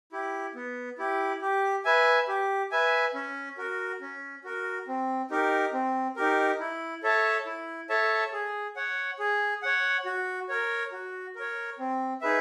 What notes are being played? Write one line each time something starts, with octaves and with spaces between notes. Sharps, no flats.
E4 G4
B3
E4 G4
G4
B4 E5 G#5
G4
B4 E5 G#5
C#4
F#4 A#4
C#4
F#4 A#4
C4
D#4 G4 A#4
C4
D#4 G4 A#4
E4
A4 C#5 E5 A5
E4
A4 C#5 E5 A5
G#4
C#5 F#5
G#4
C#5 F#5
F#4
A#4 C#5
F#4
A#4 C#5
C4
D#4 G#4 B4 E5